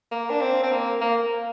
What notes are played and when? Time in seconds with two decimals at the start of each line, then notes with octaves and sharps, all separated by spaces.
0.11 A#3
0.30 D4
0.41 C4
0.63 C4
0.71 A#3
1.01 A#3